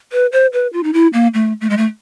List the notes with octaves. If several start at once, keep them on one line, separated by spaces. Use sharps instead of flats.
B4
C5
B4
F4
D#4
E4
A#3
A3
A3
G#3
A3